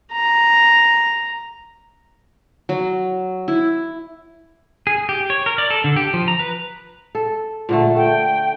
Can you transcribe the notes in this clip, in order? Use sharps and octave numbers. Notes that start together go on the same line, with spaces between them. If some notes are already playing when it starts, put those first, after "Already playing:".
A#5
F#3
E4
G#4
G4
C#5
A#4
D5
A4
D3
G4
F3
A#5
B4
A4
A#2 D3 A3
A3 G5